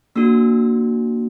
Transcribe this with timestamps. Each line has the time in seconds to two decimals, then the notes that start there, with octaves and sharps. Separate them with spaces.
0.16 A#3 D4 F#4 E6